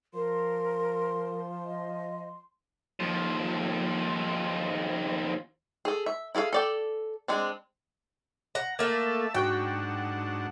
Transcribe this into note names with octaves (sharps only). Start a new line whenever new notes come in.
F3 A#4 C6
D#5
D#2 F3
G#4 A4
E5
E4 G#4 A4 F5
A4 D5 G5
G#3 C4 D4
F#5 A#5
A3 A#3 E5 A5
G#2 D4 F#4 F#5 G5 C#6